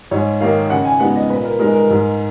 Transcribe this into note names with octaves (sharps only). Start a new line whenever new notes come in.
G#2 C#5
D#3 A#3 D#4 F5
C#3 F#5
G#5
G#3 B3 D#4 F#5
D#5
A#2 B4
A#4
G#3 D#4 A#4
A#4
G#2